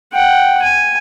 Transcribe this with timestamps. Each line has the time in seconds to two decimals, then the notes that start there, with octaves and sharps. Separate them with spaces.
0.14 F#5 G5
0.62 G#5